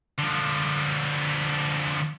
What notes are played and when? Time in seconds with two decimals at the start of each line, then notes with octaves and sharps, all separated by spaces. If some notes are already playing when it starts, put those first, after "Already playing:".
0.19 D3 F3